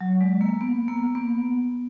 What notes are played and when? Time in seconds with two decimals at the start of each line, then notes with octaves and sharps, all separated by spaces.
0.01 F#3
0.21 G#3
0.41 A#3
0.61 B3
0.88 A#3
1.15 B3